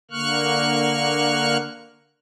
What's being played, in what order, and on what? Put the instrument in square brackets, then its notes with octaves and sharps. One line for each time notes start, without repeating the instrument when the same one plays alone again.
[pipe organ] D3 A#3 C#6 F6 F#6